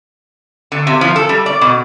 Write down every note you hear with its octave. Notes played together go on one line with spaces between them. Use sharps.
D3
C3
F3
A4
G3
D5
B2